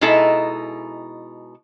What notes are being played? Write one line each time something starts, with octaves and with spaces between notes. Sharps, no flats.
B2 G#3 D#4 E4 A4